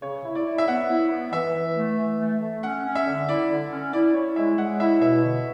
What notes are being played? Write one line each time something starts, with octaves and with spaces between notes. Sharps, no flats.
C#3 C#5
E4
D5
E4
E5
B3 F#5
E4
B3
E3 E5
E3
A3
E3
A3
A3
C#4 F#5
C#4
E5
D3
E4 D5
D3
C#4
E4 D5
E4 C#5
G#3 E5
G#3 F#5
E4 E5
B2 E5
D3